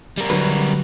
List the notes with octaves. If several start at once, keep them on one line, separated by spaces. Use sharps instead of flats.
G3 A#4
D3 F#3 B4